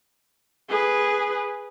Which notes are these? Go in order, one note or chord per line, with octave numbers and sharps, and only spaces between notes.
G#4 B4